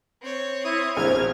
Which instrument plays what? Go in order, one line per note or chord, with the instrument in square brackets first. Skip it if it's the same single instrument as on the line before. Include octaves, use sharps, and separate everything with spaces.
[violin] C4 C#5
[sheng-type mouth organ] E4 D#6
[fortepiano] A#1 F#3 C4 [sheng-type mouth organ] E4 [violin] F6 G#6